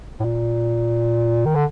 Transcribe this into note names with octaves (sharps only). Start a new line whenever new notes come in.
A2
A#2
D#3
D3